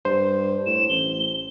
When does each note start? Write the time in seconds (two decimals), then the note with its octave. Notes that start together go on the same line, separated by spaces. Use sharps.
0.05 G2 C5
0.66 A2 E7
0.89 A1 G7